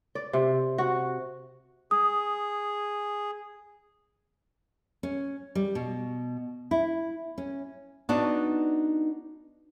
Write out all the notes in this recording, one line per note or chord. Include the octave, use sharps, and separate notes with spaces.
D5
C3
F#4
G#4 D#6
C#4
G3
B2
E4
C#4
B3 D4 D#4 F#4 D5 A5